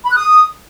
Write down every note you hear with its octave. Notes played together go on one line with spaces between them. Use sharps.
B5
F#6
D#6